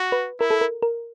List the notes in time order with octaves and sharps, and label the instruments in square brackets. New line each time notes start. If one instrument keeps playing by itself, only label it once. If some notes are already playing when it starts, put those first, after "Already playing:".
Already playing: [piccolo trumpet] F#4
[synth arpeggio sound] B4
[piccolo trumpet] E4 [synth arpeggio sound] A#4
[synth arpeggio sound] A4
A#4
A#4